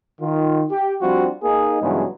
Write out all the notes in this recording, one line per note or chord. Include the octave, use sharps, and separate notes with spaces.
D#3 F4
G4
F3 G3 C4 D4 F4 F#4
A#3 D#4 G#4
G2 C#3 E3 F#3 G#3 B3